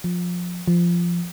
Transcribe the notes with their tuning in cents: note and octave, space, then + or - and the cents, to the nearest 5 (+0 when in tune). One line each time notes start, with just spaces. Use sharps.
F3 +20
F3 -10